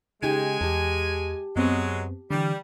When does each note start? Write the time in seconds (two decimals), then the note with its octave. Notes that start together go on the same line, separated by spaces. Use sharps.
0.23 C#3 G#3 D#4 G4 G#5
0.61 E2 G4 A5
1.56 F#2 F#3 G#3 B3 C4
2.31 D3 E3 G3